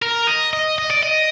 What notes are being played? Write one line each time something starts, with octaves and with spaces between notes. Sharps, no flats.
A#4
D#5
D#5
D#5
D5
D#5